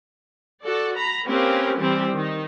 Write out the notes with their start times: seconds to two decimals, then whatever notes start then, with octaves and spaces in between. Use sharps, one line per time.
0.64 F#4 A4 D5
0.96 A#5 B5
1.28 A#3 C4 C#4 G4 A#4 B4
1.78 E3 G3 C4 E4 G4
2.13 D#3 D#4